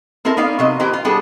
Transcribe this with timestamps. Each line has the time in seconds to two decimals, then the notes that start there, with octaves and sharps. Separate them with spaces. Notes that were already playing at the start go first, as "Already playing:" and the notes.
0.25 A#3 C4 E4 A4 A#4
0.37 B3 D#4 D5 F5
0.59 C3 F#3 D#5
0.80 E3 G4 A#4 C5
0.93 F4
1.05 G3 B3 D4 G#4 A4